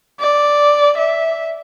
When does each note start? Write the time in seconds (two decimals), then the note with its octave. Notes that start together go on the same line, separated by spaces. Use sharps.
0.20 D5
0.98 E5